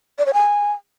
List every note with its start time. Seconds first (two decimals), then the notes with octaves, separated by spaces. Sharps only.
0.18 D5
0.26 C#5
0.33 G#5